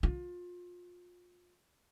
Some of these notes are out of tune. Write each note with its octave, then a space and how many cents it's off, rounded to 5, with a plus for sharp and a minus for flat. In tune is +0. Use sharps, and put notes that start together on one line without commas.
F4 +25